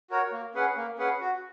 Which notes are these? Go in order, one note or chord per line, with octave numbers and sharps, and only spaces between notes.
F#4 A#4 C#5
A#3
C#4 G#4 B4 F#5
A#3
C#4 G#4 B4 F#5
F#4